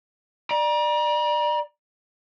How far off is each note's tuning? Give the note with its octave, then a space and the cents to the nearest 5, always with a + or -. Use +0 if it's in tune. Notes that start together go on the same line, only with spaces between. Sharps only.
D5 +25 A#5 +40